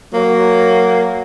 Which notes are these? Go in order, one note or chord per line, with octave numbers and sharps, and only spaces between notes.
F#3 A#3